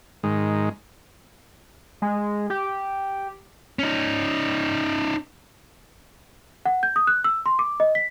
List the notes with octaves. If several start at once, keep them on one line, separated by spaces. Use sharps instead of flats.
G#2 D#3 G#3
G#3
G4
C#4 D#4
F#5
G6
D#6
F#6
E6
C6
D6
D#5
B6